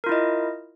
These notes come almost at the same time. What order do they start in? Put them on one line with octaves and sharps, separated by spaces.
A#4 F4 E4 D#5